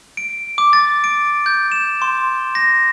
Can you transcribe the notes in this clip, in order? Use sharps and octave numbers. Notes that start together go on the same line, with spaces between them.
D7
D6
A6
D7
G6
E7
C6
A#6